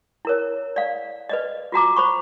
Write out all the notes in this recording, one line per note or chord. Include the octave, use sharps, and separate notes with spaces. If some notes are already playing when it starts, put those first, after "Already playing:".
E4 A#4 C#5
D5 F5
B4 D5 D#5
F4 F#4 A#5 D6
C5 B5 C#6